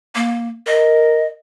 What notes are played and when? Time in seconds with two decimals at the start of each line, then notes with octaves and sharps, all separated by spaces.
0.15 A#3
0.67 A#4 D#5